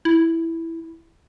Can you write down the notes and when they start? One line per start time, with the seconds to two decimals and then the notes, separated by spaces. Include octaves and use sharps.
0.05 E4